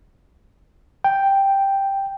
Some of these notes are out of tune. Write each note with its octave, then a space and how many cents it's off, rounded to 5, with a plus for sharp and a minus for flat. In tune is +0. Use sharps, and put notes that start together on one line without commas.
G5 +0